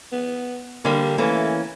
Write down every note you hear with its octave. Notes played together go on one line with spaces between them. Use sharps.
B3
D3 G3 A#3
E3 A3 A#3 C#4